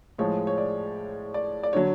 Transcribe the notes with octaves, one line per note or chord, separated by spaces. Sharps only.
A2 F3 G#3 C#5
C#5
D5
D5
D5
D3 F#3 C#5